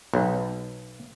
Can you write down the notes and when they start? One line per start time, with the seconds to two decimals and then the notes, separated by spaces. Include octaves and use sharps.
0.14 B1